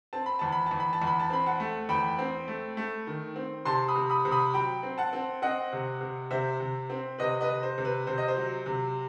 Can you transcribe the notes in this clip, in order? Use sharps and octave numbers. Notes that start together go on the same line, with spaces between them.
C4 A5
B5
E2 A5
B5
E2 A5
B5
A5
E2
B5
A5
C4 B5
F#5 A5
A3
E2 G5 B5
C4
A3
A3
D#3
C4
C3 A5 C6
B5 D#6
C3
B5 D#6
C3
B5 D#6
F#3 G5 B5
C4
F#5 A5
C4
C4 D#5 F#5
C3
C3
C3 C5 E5
C3
C4
C3 B4 D#5
B4 D#5
C3
C5
C3
B4
C3 C5
D#5
C5
F#3
C3